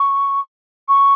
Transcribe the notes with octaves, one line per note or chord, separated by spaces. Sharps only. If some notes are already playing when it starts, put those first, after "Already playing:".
Already playing: C#6
C#6